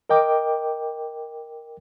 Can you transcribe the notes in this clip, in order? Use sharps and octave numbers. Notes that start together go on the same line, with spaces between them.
A#4 D#5 G5 D6